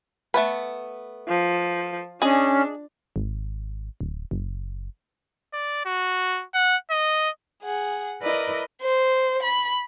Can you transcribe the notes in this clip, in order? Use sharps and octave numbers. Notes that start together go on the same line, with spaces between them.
A3 B3 B4
F3
C#4 D4 G#4 D#5
G#1
D1
F#1
D5
F#4
F#5
D#5
G#4 F#5
E4 A#4 B4 D5 D#5
C5
B5